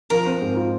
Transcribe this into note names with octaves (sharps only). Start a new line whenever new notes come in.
F3 A#4
C4
G#2
F4